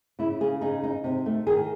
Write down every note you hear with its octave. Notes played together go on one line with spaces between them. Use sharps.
C#3 E4
C#3 G#4
D#4 G#4
D#4
C3
A3
D#3 G#4